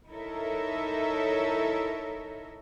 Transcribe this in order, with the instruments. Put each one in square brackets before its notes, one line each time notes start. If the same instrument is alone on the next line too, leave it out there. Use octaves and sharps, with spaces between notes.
[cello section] D#4 E4 A4 A#4 C#5 E5